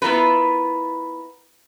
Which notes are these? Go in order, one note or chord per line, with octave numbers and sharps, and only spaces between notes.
B3 E4 F4 A#4 B4